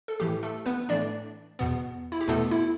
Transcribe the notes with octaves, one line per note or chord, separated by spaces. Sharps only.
A4
A2 E3 A3 G4
A3 A4
B3 B4
A2 E3 A3 D4 D5
E2 B2 B3
E4
G4
E2 B2 A3 B3 A4
E4